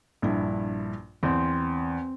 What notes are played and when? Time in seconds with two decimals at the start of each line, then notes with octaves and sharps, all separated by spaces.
0.22 A#1 G2 E4
1.23 E2 C4